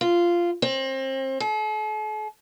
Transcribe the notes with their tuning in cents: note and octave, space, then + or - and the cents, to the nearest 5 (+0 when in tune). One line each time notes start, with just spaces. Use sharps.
F4 -10
C4 +30
A4 -45